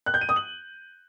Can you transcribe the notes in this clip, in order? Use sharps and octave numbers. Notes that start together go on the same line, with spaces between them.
F#6
G6
D#7
D#6
F#7